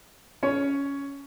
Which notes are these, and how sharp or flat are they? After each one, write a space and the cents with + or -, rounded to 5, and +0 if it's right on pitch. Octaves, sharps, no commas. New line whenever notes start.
C#4 +10 C#5 +10